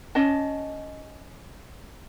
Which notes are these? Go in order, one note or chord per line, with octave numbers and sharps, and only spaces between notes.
C#4 D#5 A5